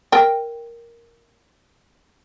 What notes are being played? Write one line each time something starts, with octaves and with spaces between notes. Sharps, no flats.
A#4 G5